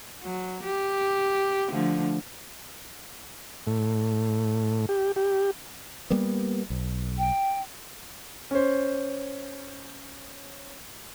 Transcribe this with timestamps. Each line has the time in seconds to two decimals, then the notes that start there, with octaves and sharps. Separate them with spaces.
0.22 F#3
0.63 G4
1.71 D3 F3 A3
3.67 A2
4.89 G4
5.16 G4
6.10 G3 A#3 B3
6.70 B1
7.18 G5
8.51 C#4 C5